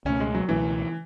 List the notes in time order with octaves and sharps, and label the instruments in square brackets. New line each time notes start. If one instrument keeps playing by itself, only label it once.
[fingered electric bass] C#2 B2 A3 [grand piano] C#4
[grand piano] G#3
F#3
[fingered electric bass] C#2 B2 A3 [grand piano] E3